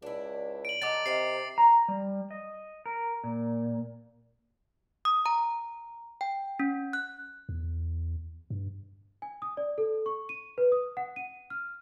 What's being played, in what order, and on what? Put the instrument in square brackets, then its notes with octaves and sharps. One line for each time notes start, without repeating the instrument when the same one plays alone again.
[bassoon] C#2 [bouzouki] D4 E4
[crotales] D7 F#7
[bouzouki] F#3 D#4 A4 [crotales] D6 A6
[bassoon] C3 [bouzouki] C4 D#4 A#4 [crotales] C7
[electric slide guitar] A#5
G3
D#5
A#4
A#2
[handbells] D#6
A#5
G5
C#4
F#6
[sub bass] E2
G2
[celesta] G#5
D#6
D5
A4
C#6
D#7
B4
D#6
F#5
D#7
F6